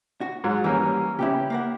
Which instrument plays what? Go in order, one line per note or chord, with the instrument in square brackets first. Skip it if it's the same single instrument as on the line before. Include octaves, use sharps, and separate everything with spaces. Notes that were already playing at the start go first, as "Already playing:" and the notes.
[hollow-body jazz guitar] F#4
[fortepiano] G#2 F#3
[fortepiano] E3 A#3 C#4 [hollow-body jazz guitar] G3
[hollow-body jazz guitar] C#3 B3 C#4 [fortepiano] E4 G4
[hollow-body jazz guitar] A#3 A#4 F#5